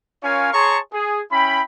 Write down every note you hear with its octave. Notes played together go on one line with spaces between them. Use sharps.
C#4 F4 A#4 C#5 F5 G#5
G#4 C#5 A5 A#5 C6 C#6
G#4
C#4 E4 G5 B5